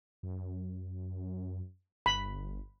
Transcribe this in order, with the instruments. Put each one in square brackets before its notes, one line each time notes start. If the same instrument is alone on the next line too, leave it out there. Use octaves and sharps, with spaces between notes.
[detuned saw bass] F#2
[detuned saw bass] G1 [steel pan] B5